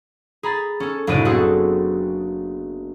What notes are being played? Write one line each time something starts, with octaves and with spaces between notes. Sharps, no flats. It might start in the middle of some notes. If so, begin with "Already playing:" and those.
G#4 A#5 B5 A6
C#4 A4
F#1 C2 A2 D4 D5 D#7
B3 C4 F#4 G#4 A4